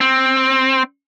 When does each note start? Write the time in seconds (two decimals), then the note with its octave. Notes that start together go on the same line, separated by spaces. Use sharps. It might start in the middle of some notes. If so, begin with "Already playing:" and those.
0.01 C4